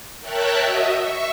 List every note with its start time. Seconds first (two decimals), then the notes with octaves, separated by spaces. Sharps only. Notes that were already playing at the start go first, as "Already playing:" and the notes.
0.21 A#4 C#5 E5 G5 A5 F#6
0.57 F#4 D#5 E5
0.98 E5 C#6